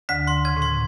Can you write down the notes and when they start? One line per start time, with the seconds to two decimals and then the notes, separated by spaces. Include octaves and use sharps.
0.09 D2 D3 B6
0.27 C6
0.45 C#3 G#6
0.57 A2
0.62 C6
0.69 A#2